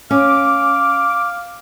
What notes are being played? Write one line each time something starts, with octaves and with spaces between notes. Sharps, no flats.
C#4 F5 D6